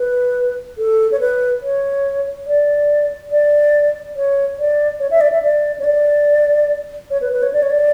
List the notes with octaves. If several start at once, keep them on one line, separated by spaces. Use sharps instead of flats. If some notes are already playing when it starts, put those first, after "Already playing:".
Already playing: B4
A4
C#5
B4
C#5
D5
D5
C#5
D5
C#5
E5
D5
E5
D5
C#5
D5
C#5
B4
B4
C#5
D5
C#5
D5